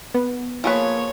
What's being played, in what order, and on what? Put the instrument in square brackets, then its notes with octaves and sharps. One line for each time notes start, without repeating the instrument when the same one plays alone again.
[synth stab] B3
[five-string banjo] F3 G#4 B4 [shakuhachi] A#3 [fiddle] C#5